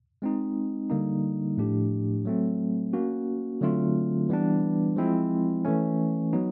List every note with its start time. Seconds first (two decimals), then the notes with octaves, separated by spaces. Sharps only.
0.22 G#3 C4 D#4
0.90 D3 G3 A#3 D#4
1.57 A2 F3 A3 D4 G4
2.25 F#3 A3 C4
2.93 A#3 C#4 F#4
3.61 D3 F#3 A3 C4 F4
4.29 E3 G3 B3 D4
4.96 F3 G#3 C4 E4
5.65 E3 A3 C#4
6.33 F#3 B3 D#4